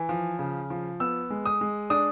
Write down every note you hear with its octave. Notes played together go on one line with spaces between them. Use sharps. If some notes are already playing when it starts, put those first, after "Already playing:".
Already playing: E3
F3
C#3
F3
B3 E6
G#3
D#6
G#3
D4 D#6